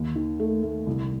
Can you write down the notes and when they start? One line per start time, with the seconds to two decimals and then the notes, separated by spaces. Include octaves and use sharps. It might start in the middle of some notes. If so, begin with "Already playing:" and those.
Already playing: D#2
0.15 D#3
0.40 A3
0.63 A3
0.87 C2